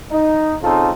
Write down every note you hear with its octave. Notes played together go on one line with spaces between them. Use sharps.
D#4
C#3 C4 D#4 F4 A4